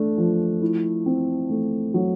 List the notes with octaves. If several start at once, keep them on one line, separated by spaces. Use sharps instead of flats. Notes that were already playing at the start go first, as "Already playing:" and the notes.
Already playing: A3 D4
F3
E4
C4
A3
F#3